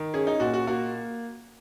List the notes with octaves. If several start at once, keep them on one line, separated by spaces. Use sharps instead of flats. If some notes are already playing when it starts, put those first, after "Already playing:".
Already playing: D#3
C#4 G#4
D#4
A#2 F#4
F#4
A#3 F#4